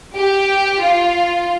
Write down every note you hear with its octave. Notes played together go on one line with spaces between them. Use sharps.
G4
F4